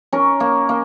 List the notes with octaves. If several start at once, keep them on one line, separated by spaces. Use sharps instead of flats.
C#4 A#4
A#3
A#3